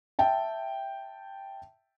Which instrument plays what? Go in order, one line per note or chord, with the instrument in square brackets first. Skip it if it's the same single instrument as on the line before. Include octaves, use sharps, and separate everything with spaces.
[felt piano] E5 G5 A5